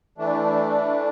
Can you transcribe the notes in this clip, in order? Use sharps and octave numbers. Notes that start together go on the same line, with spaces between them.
E3 A3 D4